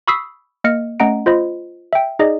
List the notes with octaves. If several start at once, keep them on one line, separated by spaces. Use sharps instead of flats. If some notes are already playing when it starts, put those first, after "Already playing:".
B5 C#6 D#6 E6 B6 C7
A#3 D#5 F6 C#7
A3 C#4 D#5 F#5 A#5 D7
F4 C5 D#5 B5
E5 G5
D#4 G#4 D5 D#5